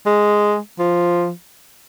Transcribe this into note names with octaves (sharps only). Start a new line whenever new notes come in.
G#3
F3